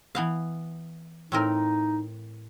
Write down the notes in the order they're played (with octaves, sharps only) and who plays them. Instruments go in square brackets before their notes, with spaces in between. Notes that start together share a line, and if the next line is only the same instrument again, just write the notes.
[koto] E3 B3 F5
[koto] A2 C4 A#4 [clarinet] D#4